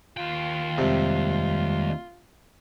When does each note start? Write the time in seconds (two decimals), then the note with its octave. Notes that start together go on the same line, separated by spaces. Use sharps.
0.17 D#2 F4 G5
0.78 F2 C3 G3 G#3